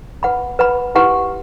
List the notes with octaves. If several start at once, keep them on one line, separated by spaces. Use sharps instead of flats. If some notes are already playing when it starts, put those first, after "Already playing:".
B4 F#5 B5
B4 F#5 B5
E4 G4 B4 F#5 C6